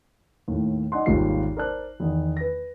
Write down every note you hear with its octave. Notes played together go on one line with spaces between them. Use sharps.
D#2 A2
D#4 D5 D#5 F#5 G#5 C6
G#1 D#2 G#2 G3 F4 C7
A#4 C5 D5 A5 F#6
E2 D#3
B4 A#6